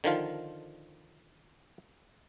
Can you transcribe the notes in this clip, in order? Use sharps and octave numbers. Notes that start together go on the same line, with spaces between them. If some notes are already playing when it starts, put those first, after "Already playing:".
D3 D#3 F3 F4